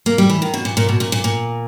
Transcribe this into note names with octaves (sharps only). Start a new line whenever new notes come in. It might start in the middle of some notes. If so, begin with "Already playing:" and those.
A#3
G3
E3
D#3
B2
A#2
A#2
B2
A#2
A#2
A#2